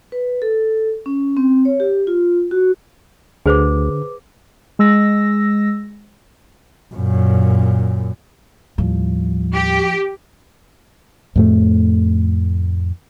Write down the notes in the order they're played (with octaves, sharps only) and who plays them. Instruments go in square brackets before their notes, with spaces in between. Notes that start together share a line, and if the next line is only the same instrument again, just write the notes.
[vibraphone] B4
A4
C#4
C4
C#5
G4
F4
F#4
[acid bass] D2 [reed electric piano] D3 [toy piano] G#4 C5 [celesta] B4 D6
[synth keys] G#3 E6 A#6
[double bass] F#2 A#2
[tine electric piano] D#2 A2 G3 [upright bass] F3
[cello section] G4
[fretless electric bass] F2 A2 A3